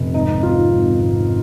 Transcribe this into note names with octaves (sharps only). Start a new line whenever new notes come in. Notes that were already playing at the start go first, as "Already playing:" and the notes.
Already playing: F1
G#1 D#4
G#2 F4
G#1
G#1